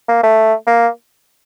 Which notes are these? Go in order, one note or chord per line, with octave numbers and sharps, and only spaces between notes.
A#3
A3
A#3